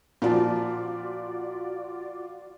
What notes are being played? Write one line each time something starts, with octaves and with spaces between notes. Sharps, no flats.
A#2 F3 F4 F#4 D5